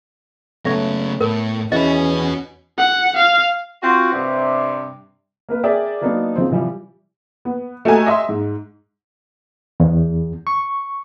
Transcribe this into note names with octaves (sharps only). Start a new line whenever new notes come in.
C#3 F#3 A3 B3 C#5 E5
A2 A#4
E2 E3 C#4 F#4 B4 D#5
F#5
F5
C4 F4 F#4
G2 C3
A#3 A#4 B4
G#4 A#4 D5 E5 G5
F#3 A#3 B3 D4 D#4
C#3 F3 C4
C3 E3 F3 G3
B3
A3 F#4 G4 D#5 G#5 A#5
D#5 E5 C6
G#2
E2
C#6